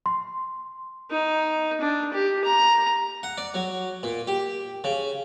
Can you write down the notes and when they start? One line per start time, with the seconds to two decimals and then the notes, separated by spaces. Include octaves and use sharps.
0.06 C6
1.11 D#4
1.81 D4
2.13 G4
2.44 A#5
3.23 F#5
3.38 D5
3.54 F#3
4.03 A#2
4.27 G4
4.84 C#3